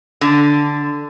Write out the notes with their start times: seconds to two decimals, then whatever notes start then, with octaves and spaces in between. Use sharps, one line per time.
0.21 D3